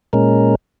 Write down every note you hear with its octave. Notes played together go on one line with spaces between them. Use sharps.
A#2 G#3 C#4 A#4